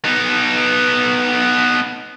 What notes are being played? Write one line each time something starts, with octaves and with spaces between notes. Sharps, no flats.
B3 D#4